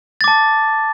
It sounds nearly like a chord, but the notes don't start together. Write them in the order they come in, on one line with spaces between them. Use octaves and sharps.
A6 D6 A5